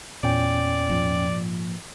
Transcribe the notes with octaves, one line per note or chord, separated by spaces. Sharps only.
E2 A#2 C#4 D5 G5
G#2 F3